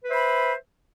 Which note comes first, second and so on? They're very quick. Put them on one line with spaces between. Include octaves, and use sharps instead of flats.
B4 C5 E5 B5